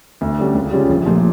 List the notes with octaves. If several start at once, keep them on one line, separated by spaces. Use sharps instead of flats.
D2
D3 G3 C#4
C#2
C#3 G3 C#4 F4
A#1
A#2 F3 A3